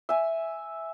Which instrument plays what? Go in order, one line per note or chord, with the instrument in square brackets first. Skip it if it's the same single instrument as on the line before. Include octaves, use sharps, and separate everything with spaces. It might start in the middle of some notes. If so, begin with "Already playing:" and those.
[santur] E5 G#5